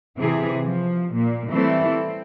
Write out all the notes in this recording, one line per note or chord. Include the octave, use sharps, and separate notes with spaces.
C3 E3 G#4
F3
A#2
E3 G3 A3 C4 E4 A4
C4